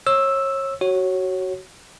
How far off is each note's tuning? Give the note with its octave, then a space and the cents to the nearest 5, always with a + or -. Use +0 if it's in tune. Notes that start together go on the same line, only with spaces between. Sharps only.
C#5 -30 E6 +0
F#4 +20 C#5 -10